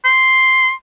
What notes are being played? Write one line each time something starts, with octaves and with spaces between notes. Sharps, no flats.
C6